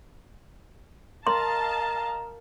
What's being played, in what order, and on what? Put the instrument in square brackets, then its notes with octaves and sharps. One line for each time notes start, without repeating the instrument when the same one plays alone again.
[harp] A#4 [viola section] D#5 F5 A5 [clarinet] A#5 [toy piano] C6